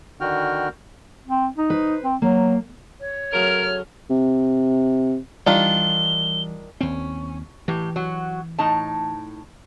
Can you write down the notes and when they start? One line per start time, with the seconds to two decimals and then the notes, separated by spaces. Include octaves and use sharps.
0.21 D3 D#3 F#4 G5 F6
1.28 C4
1.57 D#4
1.70 B4 C5
2.04 C4
2.22 F#3 A#3
3.00 C#5
3.33 C#3 F#3 A3 A#4 F6
4.10 C3
5.46 D#3 E3 G3 D4 F4 G7
6.81 D#2 C4 C#4
7.68 A2 E3 G4
7.96 F#3 F#4
8.59 A2 D#4 A5